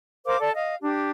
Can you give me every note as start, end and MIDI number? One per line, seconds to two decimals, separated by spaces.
0.25 0.39 70
0.25 0.39 72
0.25 0.39 77
0.25 0.39 86
0.39 0.51 69
0.39 0.51 74
0.39 0.51 81
0.53 0.75 75
0.53 0.75 77
0.81 1.11 62
0.81 1.11 67